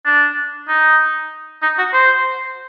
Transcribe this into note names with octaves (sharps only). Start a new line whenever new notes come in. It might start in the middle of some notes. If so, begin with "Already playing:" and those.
D4
D#4
D#4
F#4
C5